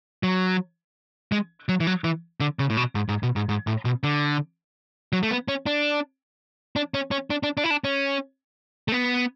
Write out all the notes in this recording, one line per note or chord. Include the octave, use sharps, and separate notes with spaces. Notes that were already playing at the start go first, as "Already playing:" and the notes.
F#3
G#3
F#3
E3
F#3
E3
D3
C#3
A2
B2
G#2
G#2
B2
G#2
G#2
A2
B2
D3
F#3
A3
B3
C#4
D4
D4
C#4
C#4
D4
D4
D4
E4
D4
C#4
A3
B3